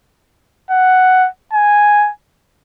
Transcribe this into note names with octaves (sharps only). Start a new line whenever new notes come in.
F#5
G#5